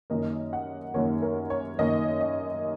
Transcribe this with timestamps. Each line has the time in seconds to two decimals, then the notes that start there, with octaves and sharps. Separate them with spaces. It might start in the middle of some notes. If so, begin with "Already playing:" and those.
0.10 F#2 D#3 A#3 D#5
0.53 F#5
0.94 F#2 D#3 A#3 C#5
1.22 A#4
1.50 C#5
1.79 F#2 D#3 A#3 D#5
2.21 D#5